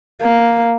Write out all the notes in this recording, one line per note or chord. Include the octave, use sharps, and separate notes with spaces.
A#3